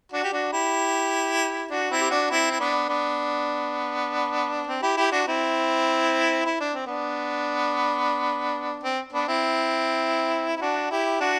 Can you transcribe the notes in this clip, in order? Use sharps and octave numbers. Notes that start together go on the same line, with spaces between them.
D4 F#4
G4
D4 F#4
E4 G4
D4 F#4
C4 E4
G4
D4 F#4
C4 E4
E4
B3 D4
B3 D4
C4
E4 G4
E4 G4
D4 F#4
C4 E4
E4
D4
C4
B3 D4
C4
B3 D4
C4 E4
E4
D4 F#4
E4 G4
D4 F#4